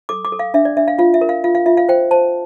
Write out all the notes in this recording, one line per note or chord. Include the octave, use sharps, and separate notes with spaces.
A4 D6
D6
A4
F5
D4 E5
D5
D4 E5
F5
F4 F5
E5
A#4
F5
F4 F5
F5
F4 E5
F5
C5 G5
C5 A5